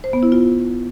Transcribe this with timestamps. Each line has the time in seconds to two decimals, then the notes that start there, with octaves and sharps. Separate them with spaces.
0.04 C5
0.13 B3
0.23 E4
0.32 F4